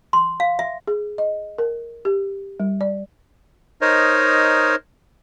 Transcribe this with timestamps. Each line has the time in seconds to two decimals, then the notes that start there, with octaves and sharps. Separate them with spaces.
0.13 C6
0.40 F5
0.59 E5
0.87 G#4
1.18 D#5
1.58 A#4
2.05 G4
2.60 G3
2.81 D5
3.81 D#4 A#4 C5 C#5 D#5